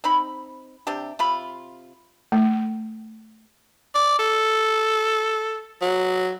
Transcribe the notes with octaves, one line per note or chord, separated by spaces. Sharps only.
C4 D#4 B5
C3 D4 G4
C3 F4 B5
A3
D5
A4
F#3